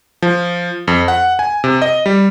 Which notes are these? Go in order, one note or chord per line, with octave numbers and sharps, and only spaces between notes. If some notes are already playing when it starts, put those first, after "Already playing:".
F3
F2
F#5
G#5
C3
D#5
G3